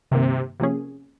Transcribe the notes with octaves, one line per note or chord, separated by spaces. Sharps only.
G2 C3 D#3 A#3
C3 F3 A#3 C#4 G#4